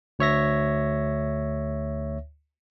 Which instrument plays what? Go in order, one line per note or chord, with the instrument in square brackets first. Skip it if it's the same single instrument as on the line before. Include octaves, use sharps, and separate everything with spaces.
[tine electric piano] D2 C#5 E5 A#6